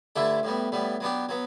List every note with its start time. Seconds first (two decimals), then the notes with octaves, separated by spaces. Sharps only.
0.16 G2 D3 A3 E4 A4
0.43 A2 G3 B3
0.72 A2 G3 B3
1.00 F#3 B3 D4 G4
1.29 F#3 B3